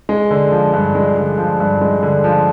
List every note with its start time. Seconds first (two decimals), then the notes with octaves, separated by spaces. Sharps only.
0.09 G#3
0.31 D3
0.52 F3
0.73 G2
0.95 G#3
1.16 D3
1.38 F3
1.60 G2
1.81 G#3
2.03 D3
2.24 F3